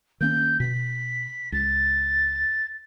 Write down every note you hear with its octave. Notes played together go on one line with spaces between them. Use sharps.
D#3 A#3 C#4 G6
B2 B6
C#2 A6